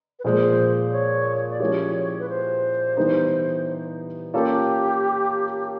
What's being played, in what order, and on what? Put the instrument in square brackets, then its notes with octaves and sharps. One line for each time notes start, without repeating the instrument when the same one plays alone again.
[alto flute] B4
[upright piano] A#2 F3 G#3 [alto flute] C5
[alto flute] C#5
D5
[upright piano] F3 G#3 C#4 E4 G4 [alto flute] C#5
[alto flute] B4
C5
[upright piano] E3 G3 B3 D#4
[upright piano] A#3 C#4 F4 A4 [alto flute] G4